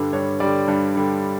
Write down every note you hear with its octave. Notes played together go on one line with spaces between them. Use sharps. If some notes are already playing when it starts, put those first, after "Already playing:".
Already playing: G2 D3 G3 B4
G2 C#5
D3 G3 D5
G2
D3 G3